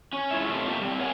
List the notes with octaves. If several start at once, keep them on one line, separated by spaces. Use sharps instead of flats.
C#4
G#3 E4 F4 C#5 E5
A3 C4 C#4 D#4 F4 G4
A3 A#3 G4
G3 C4
A#4 C#5 F5 F#5 G#5